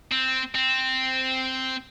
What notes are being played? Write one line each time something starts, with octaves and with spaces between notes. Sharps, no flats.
C4
C4